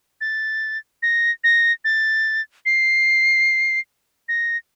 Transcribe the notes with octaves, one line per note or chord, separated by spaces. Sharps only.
A6
A#6
A#6
A6
C7
A#6